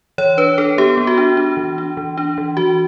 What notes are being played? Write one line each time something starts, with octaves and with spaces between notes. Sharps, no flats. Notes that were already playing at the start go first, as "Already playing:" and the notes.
E3 C#5
D4 B4
D4 A4
B3 G4
B3
F#4
D4
D4
E3
D4
E3
D4
E3
E3 F#4